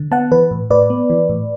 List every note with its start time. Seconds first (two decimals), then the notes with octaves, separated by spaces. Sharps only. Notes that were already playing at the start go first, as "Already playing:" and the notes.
Already playing: D3
0.11 B3 F#5 A5
0.32 E3 B4
0.51 A2
0.70 A2 B4 D5
0.90 B3
1.10 E3
1.29 A2